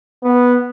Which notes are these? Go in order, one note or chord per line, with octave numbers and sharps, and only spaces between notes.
B3